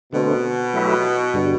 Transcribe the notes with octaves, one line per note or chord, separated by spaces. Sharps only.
B2 D3 A3 C4
F#3 A3 E4 G4 B4
G2 D3 G3